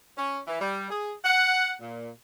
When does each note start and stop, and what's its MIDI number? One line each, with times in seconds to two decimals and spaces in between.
0.17 0.39 61
0.47 0.60 52
0.61 0.89 55
0.90 1.13 68
1.24 1.74 78
1.82 2.09 46